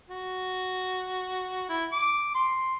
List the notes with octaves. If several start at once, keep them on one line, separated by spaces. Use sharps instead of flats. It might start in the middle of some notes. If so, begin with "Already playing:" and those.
F#4
E4
D6
C6